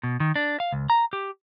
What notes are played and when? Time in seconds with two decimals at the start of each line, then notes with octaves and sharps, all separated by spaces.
0.03 B2
0.20 D#3
0.36 D4
0.60 F5
0.72 C#2
0.90 A#5
1.13 G4